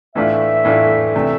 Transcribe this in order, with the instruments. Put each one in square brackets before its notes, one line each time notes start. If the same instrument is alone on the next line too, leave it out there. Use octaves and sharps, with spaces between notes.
[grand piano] A2 E3 A3 D4 F4 [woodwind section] E5
[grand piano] A2 E3 A3 D4 F4
[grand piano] C3 E3 A3 D4 [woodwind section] E5